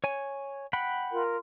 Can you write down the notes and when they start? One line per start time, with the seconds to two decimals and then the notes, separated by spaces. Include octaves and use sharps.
0.04 C#5 G#5
0.73 F#5 G5 B5
1.11 F4 A#4